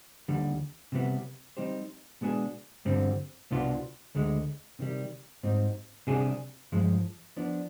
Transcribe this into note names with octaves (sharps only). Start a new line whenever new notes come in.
D#2 D3 G3
C3 G3 B3
G3 C4 D#4 G4 C5
B2 G#3 B3 D4 G#4
G2 D3 G3 C4
C2 B2 B3 D4 F4
D2 D3 G#3
C3 D#3 G3
G#2 G3 C4 D#4
C3 G3 D4 G#4
G2 F3 G#3
F3 B3 D4